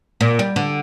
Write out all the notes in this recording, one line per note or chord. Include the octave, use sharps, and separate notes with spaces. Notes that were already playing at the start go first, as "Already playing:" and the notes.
A#2
G3
D3